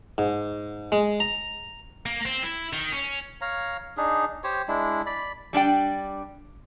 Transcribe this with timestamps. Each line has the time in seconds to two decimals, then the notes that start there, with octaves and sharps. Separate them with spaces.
0.18 G#2
0.92 G#3
1.20 A#5
2.06 A#3
2.25 C4
2.43 E4
2.73 D#3
2.92 C#4
3.41 C#5 F5 A#5
3.97 D4 D#4 G#4
4.44 G4 C5 C#5
4.68 G#3 D4 E4
5.06 D5 B5
5.53 G3 D4 D5 G5